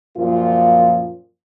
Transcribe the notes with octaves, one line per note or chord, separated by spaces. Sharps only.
F#2 A#2 F3 F4